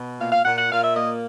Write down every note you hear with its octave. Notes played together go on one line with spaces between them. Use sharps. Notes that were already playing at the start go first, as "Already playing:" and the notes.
Already playing: B2
A#2 F5
F5
A#2 F#5
F#5
A#2 F5
E5
A#3 D#5